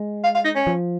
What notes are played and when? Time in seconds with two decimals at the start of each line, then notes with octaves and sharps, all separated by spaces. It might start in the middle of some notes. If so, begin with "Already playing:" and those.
Already playing: G#3
0.24 F5
0.35 F5
0.45 D#4
0.56 C#4
0.67 F3